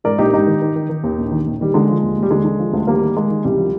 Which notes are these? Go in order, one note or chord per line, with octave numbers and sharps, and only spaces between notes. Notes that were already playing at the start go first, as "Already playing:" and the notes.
G#2 A#4 D5
A#1 D#4 G4
G#2 D#4 G4
D#3
D#3
D#3
D#3
D#2
A#1
D#3
A#1
D#3 G3
D3 G#3
F3
D#2
D#2
G3
D3 G#3
D3
F3
D2
D#3 G3 A#3
D#3
D#3 G#3
D#3
C2 G3
F3